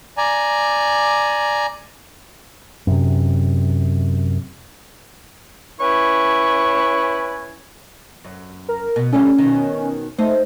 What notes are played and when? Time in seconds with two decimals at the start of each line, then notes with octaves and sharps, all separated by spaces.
0.17 D5 G#5 A#5
2.87 F#2 C3
5.80 C#4 E4 B4 G#5 C#6
8.25 F#2
8.69 A#4
8.96 B2
9.13 D3 G3 A3 C#4
9.38 B2 D#3
10.19 A3 D#4 C5